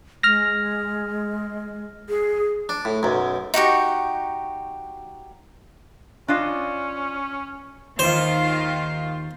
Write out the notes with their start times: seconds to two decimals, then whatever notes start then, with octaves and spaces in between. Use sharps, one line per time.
0.23 G#3 F6 A#6
2.09 G#4
2.69 D4
2.85 A2
3.03 B1 F#2
3.54 D#4 F#4 G4 C#6
6.28 C#4 D4 F4 D#5
7.99 D#2 D#3 F4 C5